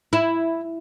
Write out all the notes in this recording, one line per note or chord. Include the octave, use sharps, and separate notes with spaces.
E4